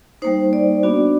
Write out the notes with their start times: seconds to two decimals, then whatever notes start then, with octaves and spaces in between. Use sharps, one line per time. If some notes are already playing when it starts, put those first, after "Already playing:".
0.22 G3 A#3 D#4 C5
0.53 D5
0.83 B3 D4 F#4